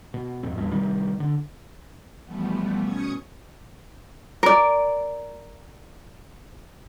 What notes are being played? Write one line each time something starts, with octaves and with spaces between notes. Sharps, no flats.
B2
D#1 G#1 F2 C4
A#1 E2 G2
C3 D#3 G3
D3
B2 E3 F3 G3 A3 B3
B2 C#4 C#6 D#6 G#6 C#7
A#4 D5